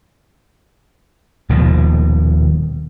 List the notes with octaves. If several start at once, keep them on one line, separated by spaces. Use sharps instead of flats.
D#1 D#2 B2 F3